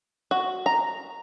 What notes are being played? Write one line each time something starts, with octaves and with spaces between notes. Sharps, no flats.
F#4
A#5